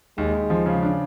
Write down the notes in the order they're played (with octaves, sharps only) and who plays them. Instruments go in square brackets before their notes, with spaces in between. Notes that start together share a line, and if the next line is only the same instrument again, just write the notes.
[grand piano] D#2 [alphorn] G#3
[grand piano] D#2
F3
C#3
D4